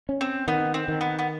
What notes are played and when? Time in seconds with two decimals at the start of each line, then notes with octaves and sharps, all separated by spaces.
0.09 C#4
0.21 C4
0.48 D#3 B3
0.74 C4
0.88 D#3
1.01 B3
1.19 B3